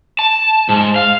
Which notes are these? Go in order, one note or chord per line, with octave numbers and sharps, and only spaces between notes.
A5
G#2
F5